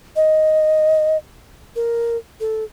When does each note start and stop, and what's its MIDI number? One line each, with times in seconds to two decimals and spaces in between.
0.16 1.17 75
1.76 2.17 70
2.40 2.64 69